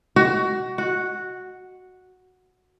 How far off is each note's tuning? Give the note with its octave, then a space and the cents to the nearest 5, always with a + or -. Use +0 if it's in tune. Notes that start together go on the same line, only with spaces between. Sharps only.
F#4 +20
F#4 -5